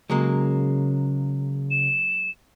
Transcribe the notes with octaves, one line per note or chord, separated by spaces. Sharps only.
C#3 F#3 G#3 A#3
E7